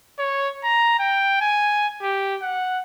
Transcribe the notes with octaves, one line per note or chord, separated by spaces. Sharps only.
C#5
A#5
G5
G#5
G4
F#5